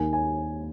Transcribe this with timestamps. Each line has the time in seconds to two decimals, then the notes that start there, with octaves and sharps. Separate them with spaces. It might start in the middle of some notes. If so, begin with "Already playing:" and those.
Already playing: D#2 D#3 A#3 D#4 G#5
0.13 G#5